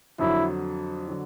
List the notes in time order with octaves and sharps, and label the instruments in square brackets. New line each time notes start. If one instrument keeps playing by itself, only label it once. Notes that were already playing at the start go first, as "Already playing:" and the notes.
[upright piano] F2 D3 F#3 [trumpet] E4
[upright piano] D3 F#3